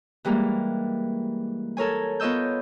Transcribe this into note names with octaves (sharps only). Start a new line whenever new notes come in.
E3 G3 G#3 A#3
A4 A#4 C#5 G#5
B3 F4 C#5 D#5 E6 G6